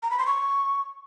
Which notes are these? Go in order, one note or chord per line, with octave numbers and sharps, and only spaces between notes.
A#5
B5
C6
C#6